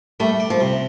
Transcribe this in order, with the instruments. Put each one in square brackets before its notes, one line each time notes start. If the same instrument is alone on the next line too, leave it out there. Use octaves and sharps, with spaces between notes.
[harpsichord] G3 [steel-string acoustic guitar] A3
[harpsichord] D5
[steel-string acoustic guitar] F3
[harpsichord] C3